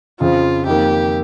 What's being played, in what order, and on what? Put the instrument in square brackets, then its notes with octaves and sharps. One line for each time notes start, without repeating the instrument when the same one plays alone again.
[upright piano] F2 C#3 F3 [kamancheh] F4
[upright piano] F2 D#3 A#3 [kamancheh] G4